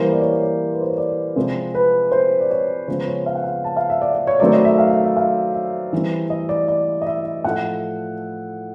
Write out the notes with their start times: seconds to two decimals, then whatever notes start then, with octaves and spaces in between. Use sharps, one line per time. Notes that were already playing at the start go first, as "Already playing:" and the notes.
Already playing: E3 G3 A#3 C5
0.12 D5
0.21 C#5
0.33 C#5
0.41 D5
0.73 B4
0.81 C5
0.90 C#5
0.98 D5
1.36 C3 F3 G#3 C4
1.75 B4
2.11 C5
2.41 D5
2.51 C#5
2.87 C#3 F3 G#3 B3 C5
3.07 C#5
3.26 F5
3.35 F#5
3.44 F5
3.64 A5
3.77 F5
3.90 E5
4.02 D5
4.14 D5
4.27 C#5
4.40 D#3 F#3 A3 C4 D5
4.53 D#5
4.65 E5
4.78 F5
4.86 E5
4.91 D#5
5.04 E5
5.17 F5
5.54 E5
5.93 E3 G3 C4
6.30 D#5
6.49 D5
6.68 D5
7.01 D#5
7.07 E5
7.25 E5
7.44 A2 F3 A3 F#5